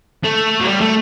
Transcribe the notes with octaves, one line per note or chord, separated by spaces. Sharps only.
A3
F#3
G3
A3